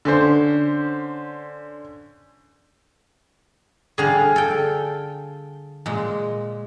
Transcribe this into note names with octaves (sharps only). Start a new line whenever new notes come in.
D3 C#4 C5
D3 G3 G#4 F5 F6
A4 G5
A#2 G#3